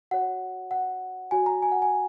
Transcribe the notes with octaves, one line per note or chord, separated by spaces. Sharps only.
F#4 C#5 F#5
F#5
F#4 C#5 G#5
A#5
G#5
F#5
G#5